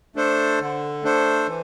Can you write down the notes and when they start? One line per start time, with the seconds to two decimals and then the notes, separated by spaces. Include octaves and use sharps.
0.16 A3 D4 A4 C5
0.60 D3
1.03 A3 D4 A4 C5
1.47 E3